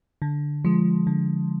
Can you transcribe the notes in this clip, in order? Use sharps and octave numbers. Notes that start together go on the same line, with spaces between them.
D3
F3 G#3
D3